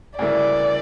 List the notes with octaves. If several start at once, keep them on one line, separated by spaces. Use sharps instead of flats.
D2 C#3 G3 A#3 E4 D5